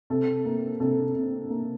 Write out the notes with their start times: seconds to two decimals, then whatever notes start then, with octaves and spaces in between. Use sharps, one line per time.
0.10 C3 A4
0.45 A#3
0.80 C3 A4
1.15 C3
1.50 A#3